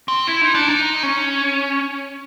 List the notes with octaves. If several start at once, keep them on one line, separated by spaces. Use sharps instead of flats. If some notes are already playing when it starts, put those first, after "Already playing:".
C4
E4
D#4
D4
D#4
C#4